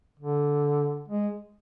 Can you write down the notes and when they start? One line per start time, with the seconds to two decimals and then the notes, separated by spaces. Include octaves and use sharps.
0.19 D3
1.08 G#3